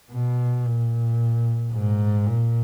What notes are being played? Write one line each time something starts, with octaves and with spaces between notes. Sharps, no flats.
B2
A#2
G#2
A#2